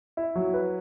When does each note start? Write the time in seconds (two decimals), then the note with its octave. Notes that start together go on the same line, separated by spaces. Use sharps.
0.17 E4
0.35 F#3
0.54 B4